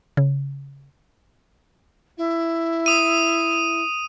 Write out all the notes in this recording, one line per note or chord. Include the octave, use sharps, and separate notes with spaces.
C#3
E4
D#6 D#7